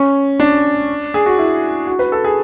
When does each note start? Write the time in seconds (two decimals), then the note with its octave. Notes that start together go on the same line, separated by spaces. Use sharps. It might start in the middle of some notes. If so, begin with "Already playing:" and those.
Already playing: C#4
0.40 D4
1.14 G#4
1.26 F#4
1.38 E4
1.87 F#4
1.99 B4
2.12 A4
2.24 G#4